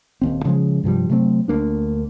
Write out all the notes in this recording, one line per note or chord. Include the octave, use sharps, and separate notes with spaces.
D#1 D#2 C4
C#3 F3 G#3
G2 C3 F3 G3
C3 F#3 A3 C4
D2 A#3 D4